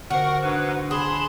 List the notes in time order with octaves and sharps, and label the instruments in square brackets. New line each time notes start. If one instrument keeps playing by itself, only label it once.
[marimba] D3 C5 [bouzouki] F#4 [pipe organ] A#4 F#5 C#6
[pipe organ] G#2 B4 [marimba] D4
[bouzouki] G#4 [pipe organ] A5 B5 C6